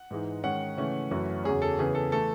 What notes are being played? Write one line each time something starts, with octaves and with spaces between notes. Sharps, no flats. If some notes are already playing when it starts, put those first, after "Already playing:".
Already playing: F#5
G#2 E3 G#3 D#4
D#3 G#3 C#4 F#5
C#3 E3 A3 C#4
F#2 E3 A3 C#4
E2 C#3 F#3 C#4 G#4
A4
C#3 E3 B3 G#4
A4
E3 A3 A4